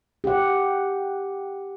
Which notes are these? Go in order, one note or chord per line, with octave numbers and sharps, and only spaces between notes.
G4 F#5